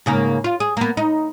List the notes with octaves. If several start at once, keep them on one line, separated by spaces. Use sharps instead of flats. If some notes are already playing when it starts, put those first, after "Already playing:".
G#2 C#3 A#3
F4
G#4
A#3 B3
D#4